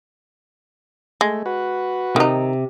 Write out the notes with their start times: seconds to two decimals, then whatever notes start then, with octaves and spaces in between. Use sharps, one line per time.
1.21 G#3 A3
1.46 F#4 B4
2.16 C3 D#3 D#4